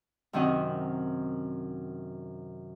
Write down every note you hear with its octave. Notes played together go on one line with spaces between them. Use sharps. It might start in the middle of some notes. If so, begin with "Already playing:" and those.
F#2 C3 D#3 F#4 D#5 F#5